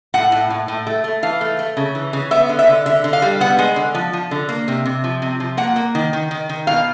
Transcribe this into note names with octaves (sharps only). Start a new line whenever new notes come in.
A2 F#5
A2
A2
A2
A3
A3
E3 F5
A3
A3
C#3
E3
C#3
B3 E5
D3
E5
D3
D3 E5
D3
F5
G3
B3 F#5
G#3
D3
F3
F3
D3
A#3
C3
C3
F3
C3
F3
A#3 F#5
A#3
D#3
D#3
D#3
D#3
B2 F5